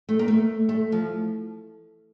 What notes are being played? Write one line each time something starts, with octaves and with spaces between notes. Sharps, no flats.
A3
A#3
A3
A3
F3